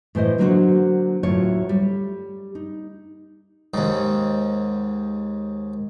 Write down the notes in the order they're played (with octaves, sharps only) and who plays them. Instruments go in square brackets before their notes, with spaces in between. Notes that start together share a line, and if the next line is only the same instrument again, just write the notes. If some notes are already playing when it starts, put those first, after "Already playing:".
[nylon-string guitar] A2 E3 C5 D#5
D3 F#3 A#3 C#4 F#4 C5
D2 A2 F#3 F4 C#5
G3
D#4
[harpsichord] D#2 G#2